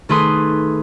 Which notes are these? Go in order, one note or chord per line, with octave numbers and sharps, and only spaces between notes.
D#3 A3 G#4 B4 C6 D#6